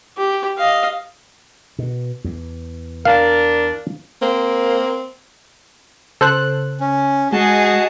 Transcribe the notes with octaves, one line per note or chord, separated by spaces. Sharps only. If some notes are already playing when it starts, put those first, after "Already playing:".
G4
D#5 F5
B2
E2
D4 A#4 F5
A#3 C4
C#3 A4 C5 F#6
C#4
G#3 F#4 G#4 D#5 A5